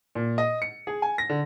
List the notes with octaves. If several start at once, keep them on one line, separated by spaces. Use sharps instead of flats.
A#2
D#5
C#7
G#4
G#5
A#6
D3